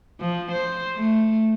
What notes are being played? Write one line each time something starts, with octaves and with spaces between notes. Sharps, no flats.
F3
C5
A3